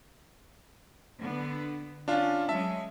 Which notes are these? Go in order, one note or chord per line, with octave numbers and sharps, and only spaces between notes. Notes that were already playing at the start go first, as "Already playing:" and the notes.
D3 B3
C#4 D4 F4
F#3 G#3 C#4 E5 A5